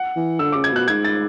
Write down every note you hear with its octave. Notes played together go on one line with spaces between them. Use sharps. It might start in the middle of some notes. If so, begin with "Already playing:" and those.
Already playing: F#5
E3
D3 E6
C#3 D6
G#6
B2 F#6
G#2 G#6
A6